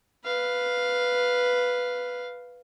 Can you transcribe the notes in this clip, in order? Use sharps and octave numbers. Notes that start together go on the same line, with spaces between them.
B4 F5